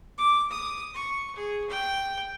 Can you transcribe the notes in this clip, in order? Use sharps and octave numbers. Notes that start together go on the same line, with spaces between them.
D6
D#6
C#6
G#4
G5